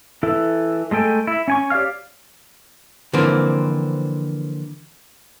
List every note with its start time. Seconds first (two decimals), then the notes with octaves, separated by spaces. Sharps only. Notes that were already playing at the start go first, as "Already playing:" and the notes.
0.23 E3 E4 A4
0.91 G#3 A3 A4 G5 G#5
1.27 E4
1.48 C#4 G#5 C#6
1.70 G4 C#5 D5 F5 F6
3.13 D3 E3 F3 A#3 C4